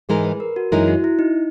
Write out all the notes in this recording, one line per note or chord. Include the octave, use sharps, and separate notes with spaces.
G#2 E3 G#3 D#4 G#4 A#4
B4
A#4
F#4
F#2 E3 G#3 D#4 E4 A#4
F#4
E4
D#4